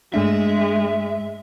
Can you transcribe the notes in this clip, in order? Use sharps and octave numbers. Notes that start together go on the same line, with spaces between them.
G2 G#3 A3 D4 E5